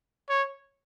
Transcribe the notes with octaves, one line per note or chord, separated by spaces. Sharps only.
C#5